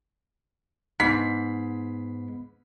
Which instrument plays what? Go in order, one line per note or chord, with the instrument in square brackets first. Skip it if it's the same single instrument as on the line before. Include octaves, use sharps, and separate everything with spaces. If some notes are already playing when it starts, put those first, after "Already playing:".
[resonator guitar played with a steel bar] G#2 [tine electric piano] B3 B5 C7 [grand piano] B6